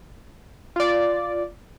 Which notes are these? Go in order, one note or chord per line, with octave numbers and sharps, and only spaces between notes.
F4 D5